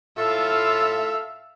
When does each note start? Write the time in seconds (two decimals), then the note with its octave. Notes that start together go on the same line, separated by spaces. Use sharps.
0.17 A2 F4 A4 E5 F5